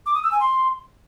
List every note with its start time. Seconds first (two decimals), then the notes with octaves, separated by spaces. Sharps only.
0.06 D6
0.15 D#6
0.23 E6
0.32 G#5
0.40 C6